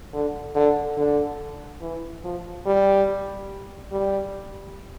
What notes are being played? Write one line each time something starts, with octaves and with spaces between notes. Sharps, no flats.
D3
D3
D3
E3
F3
G3
G3